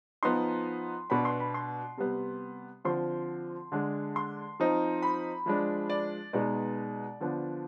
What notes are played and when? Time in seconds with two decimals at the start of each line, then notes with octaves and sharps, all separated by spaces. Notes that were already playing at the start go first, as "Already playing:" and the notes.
0.23 F3 B3 D#4 C6
1.10 B2 B3 D4 B5
1.25 C6
1.40 B5
1.54 C6
1.97 C3 G3 B3
2.85 D3 F3 C4 C6
3.72 D3 G#3 D4
4.16 C6
4.60 F3 C4 D#4
5.02 B5
5.46 F3 G#3 D4
5.90 D5
6.33 B2 G#3 B3 D#4 D5
7.20 D3 F3 B3 D4